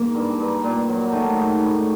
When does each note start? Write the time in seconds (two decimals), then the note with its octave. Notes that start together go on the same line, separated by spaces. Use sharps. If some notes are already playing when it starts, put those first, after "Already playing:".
Already playing: G#2 A#3
0.15 G2
0.40 G2
0.64 A#2
0.89 F#3
1.12 D#3 A3
1.37 G#2
1.61 A2